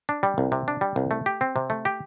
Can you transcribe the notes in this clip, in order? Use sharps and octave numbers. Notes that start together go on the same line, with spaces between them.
D4
G3
C2
C3
D4
G3
C2
A3
G4
C4
C3
A3
G4